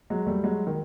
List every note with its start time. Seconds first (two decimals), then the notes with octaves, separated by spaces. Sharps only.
0.10 F#3 G#3
0.27 G3 A3
0.44 F#3 G#3
0.67 D#3